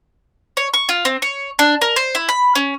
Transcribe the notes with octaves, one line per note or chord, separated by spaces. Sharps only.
C#5
C#6
F4
C4
C#5
D4
A#4
C5
E4
B5
C#4